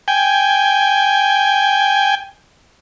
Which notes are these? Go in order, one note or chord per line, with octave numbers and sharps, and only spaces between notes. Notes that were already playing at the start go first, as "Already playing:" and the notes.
G5 G#5